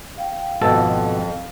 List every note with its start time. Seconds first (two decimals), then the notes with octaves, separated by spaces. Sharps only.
0.18 F5 G5
0.61 G#1 F2 B2 A4